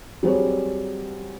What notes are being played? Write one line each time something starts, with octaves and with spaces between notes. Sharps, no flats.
F#3 G3 C4 G#4 C#5